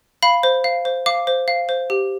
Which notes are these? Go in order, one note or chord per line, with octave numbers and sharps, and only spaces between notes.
F5 B5
C5
F5
C5
F5 D6
C5
F5
C5
G4